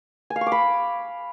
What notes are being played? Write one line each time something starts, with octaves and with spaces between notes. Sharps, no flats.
G#5
F5
C#6
D6
B5